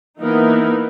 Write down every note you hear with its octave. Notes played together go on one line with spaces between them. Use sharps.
E3 A#3 B3 D#4 A#4